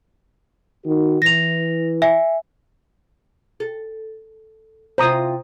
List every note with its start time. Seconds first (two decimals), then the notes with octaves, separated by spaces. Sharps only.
0.85 D#3 F#4
1.22 E3 A#6 F7
2.02 E5 G#5
3.60 A4
4.98 C3 E4 F4 C5 A#5 D#6